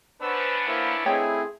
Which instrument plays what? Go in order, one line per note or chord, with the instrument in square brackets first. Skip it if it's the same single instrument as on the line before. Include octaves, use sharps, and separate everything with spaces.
[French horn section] B3 C#4 D4 [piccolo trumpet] B4 [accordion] C5 E6
[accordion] A#3 A#4 C5 [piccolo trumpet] E4
[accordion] A3 C4 E4 [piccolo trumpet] G#4 [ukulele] C#5 D#5 G5